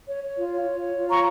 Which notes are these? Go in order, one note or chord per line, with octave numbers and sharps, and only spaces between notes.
C#5
C#5
F4
C#5
F4
C#5
F4
C#5 A#5 C#6